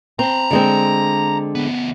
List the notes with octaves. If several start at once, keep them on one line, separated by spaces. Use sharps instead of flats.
C4 A5 A#5
D3 G#3 C4
D2 B3